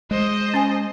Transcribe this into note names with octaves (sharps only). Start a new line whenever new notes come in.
G#3 C5 D#5
C#4 G#5